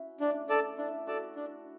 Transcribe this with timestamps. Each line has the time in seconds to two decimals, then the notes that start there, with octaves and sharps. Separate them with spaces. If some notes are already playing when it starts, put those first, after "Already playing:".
Already playing: C#4 E4 F#4
0.20 A3 D4
0.49 A4 D5 A5
0.78 D4 E4
1.07 F#4 A4 D5 A5
1.36 D4